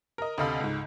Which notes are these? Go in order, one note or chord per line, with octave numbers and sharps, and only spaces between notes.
A#4 D#5
D2 C3 A4 D#5 F5 B5
C#2 G#2